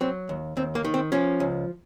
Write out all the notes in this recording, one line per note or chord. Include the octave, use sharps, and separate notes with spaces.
F#3 C4
D#2
D#2 C4
A#3
D#3
C4
F3 C#4
C#2